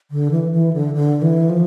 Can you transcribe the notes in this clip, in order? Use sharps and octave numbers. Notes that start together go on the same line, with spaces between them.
D3
E3
E3
D3
D3
E3
F3